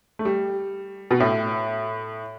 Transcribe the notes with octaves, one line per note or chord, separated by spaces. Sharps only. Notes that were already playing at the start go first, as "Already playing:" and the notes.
A3
G3
B2
A2